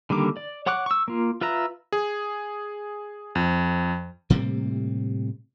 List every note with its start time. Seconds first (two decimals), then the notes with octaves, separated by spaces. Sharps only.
0.10 D3 D#3 G3 A#3 D6
0.37 D5
0.66 C#5 F#5 C#6 D6 F#6
0.86 C#6 E6
1.08 A#3 F4
1.41 F4 B4 E5 A#5
1.92 G#4
3.35 F2
4.30 A2 C3 G3 A#3